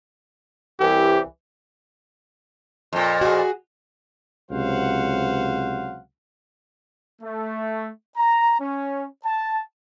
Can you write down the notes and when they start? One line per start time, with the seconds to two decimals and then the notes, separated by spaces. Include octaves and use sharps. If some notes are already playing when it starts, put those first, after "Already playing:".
0.80 C2 E3 G4
2.93 F2 A#2
3.21 F#4 G#4
4.51 C#2 C3 F#3 C5 F5 F#5
7.22 A3
8.17 A#5
8.59 C#4
9.25 A5